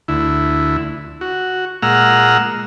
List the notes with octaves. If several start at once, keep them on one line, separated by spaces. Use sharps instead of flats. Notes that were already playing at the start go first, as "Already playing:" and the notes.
D2 E4
F#4
A#2 G#3 F#5 A#5 E6 F6